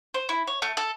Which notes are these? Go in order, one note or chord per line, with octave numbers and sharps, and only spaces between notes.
C5
E4
C#5
A3
A4